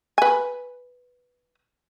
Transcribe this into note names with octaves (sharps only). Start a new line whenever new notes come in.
B4 G#5